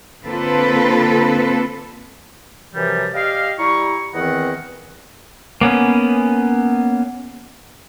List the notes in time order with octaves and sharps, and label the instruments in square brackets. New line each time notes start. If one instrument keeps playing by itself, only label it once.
[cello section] D3 A#3 C4 F4 A4 B4
[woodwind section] F#2 C3 E3 F3 G3
G4 D5 D#5 F5
G3 E4 A#5 C#6
E2 D#3 E3 C4 D#5 F#5
[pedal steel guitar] A#3 B3 C#4